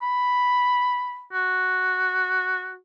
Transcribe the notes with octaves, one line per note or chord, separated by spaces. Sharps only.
B5
F#4